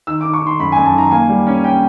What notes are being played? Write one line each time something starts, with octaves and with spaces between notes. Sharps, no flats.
D#3 E6
D#3 D6
C#6
D#3
C6
F#2 B5
F#2 G#5
A5
D#3 A#5
A#3 G#5
G3
C#4
C#4 G5